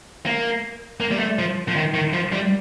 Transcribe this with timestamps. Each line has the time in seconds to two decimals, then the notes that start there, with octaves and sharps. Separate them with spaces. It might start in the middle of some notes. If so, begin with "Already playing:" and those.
0.26 A#3
1.00 A#3
1.11 G3
1.19 A3
1.39 F3
1.69 F3
1.76 D#3
1.94 D#3
2.13 F3
2.32 G3